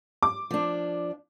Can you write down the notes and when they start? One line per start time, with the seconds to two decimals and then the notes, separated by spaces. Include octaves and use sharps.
0.23 D6
0.51 F3 D4